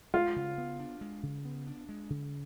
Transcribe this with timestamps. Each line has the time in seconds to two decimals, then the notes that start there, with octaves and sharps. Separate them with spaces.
0.14 G#3 F4
0.36 C#3
0.58 B3
0.80 D4
1.01 G#3
1.23 C#3
1.45 B3
1.67 D4
1.89 G#3
2.10 C#3